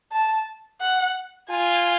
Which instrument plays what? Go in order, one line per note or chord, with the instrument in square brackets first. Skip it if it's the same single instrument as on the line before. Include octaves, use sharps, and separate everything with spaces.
[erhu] A5
F#5
[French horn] F4 [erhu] G#5